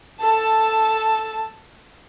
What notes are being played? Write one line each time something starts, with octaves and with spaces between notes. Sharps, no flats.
A4 A5